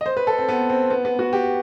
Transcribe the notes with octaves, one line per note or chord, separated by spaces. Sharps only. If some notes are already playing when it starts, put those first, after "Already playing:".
D#5
C5
B4
A4
C4
B3
C4
B3
B3
F#4
G4